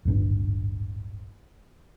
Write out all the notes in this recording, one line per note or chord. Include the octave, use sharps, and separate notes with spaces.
D1 G#1 G2 D3